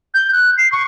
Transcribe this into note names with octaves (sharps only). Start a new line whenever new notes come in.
G6
F#6
C7
C#6